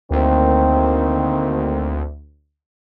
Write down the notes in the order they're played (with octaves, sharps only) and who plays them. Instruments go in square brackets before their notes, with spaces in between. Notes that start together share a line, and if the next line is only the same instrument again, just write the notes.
[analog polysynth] D2 [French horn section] D#3 A#3 C4